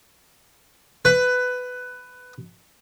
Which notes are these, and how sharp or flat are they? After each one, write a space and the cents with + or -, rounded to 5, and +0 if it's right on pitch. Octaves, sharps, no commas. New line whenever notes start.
B4 +15